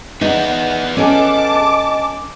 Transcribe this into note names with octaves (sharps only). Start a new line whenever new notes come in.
D#4 G#4 B4 E5
C#4 A4 D#5 G#5 A5 D6